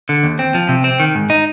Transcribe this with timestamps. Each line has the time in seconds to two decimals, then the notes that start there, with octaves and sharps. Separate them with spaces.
0.09 D3
0.23 D#2
0.39 C4
0.55 F3
0.69 C3
0.84 C4
1.00 D#3
1.15 G#2
1.30 D#4